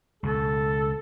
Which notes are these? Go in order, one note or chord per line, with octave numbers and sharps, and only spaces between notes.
C#2 B2 A4